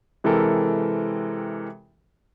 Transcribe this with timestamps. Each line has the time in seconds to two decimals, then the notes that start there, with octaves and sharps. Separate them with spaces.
0.24 C3 E3 G#3 G4 A4 A#4